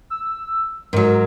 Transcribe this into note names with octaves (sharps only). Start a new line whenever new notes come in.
E6
G#2 F#3 A#4